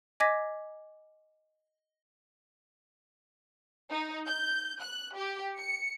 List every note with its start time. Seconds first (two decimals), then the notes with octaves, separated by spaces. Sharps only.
0.20 D#5 G#5 D6 G#6 A#6 B6
3.91 D#4
4.27 G6
4.80 F#6
5.15 G4
5.57 C#7